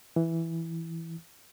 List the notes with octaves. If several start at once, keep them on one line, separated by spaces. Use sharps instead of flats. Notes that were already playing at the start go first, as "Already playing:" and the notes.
E3